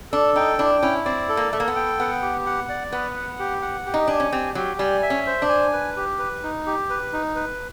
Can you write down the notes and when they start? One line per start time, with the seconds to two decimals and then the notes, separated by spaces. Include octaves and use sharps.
0.12 D4 A4
0.36 D#4 G5
0.59 D4 E4
0.82 C#4 E4
1.05 C4 D5
1.29 A4
1.37 A#3
1.53 A3 A4
1.60 A#3
1.68 B3
1.76 G5
2.00 B3 F#5
2.22 G4
2.46 F#5
2.69 D5
2.92 B3 B4
3.16 F#5
3.39 G4
3.62 F#5
3.86 G4
3.94 D#4
4.07 D4 G#5
4.20 C#4
4.32 C4 G4
4.55 F#3 G4
4.79 G3 G#5
5.03 E5
5.10 C#4
5.26 C5
5.42 D4
5.49 G#5
5.73 B4
5.96 G4
6.19 B4
6.43 D#4
6.66 G4
6.90 B4
7.13 D#4
7.36 B4